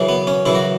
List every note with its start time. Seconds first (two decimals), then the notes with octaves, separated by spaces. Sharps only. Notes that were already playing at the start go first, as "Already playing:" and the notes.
Already playing: F#2 C#3 E3
0.09 B3
0.27 C#4
0.46 F#2 C#3 E3 E4
0.55 F#4